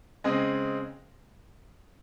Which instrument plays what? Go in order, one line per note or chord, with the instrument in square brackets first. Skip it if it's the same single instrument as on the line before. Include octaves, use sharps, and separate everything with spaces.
[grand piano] C#3 G#3 C4 D#5